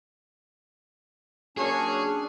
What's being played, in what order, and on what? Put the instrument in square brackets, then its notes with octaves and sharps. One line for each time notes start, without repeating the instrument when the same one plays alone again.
[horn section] F#3 A#3 C#5 [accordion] C#4 D4 [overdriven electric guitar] G#4